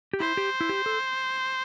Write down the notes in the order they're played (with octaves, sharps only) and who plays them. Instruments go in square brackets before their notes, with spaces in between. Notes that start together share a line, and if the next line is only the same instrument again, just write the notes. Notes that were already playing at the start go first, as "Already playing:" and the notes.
[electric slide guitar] G4
[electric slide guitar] E4 [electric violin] C5
[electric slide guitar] G4
E4
G4
A4